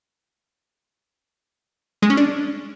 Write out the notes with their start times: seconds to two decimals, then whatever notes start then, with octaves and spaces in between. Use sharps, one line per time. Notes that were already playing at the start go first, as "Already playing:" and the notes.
2.02 G#3
2.10 C#4
2.17 D4